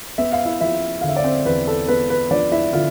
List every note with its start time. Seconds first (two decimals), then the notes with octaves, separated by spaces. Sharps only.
0.18 B3 E5
0.32 F5
0.45 E4 E5
0.61 F3 E4 E5
1.01 D3 F5
1.09 E5
1.17 D5
1.24 C4 C5
1.45 E2 B4
1.68 A4
1.88 B3 B4
2.10 B4
2.31 F3 D4 D5
2.52 E4 E5
2.73 D3 F4 F5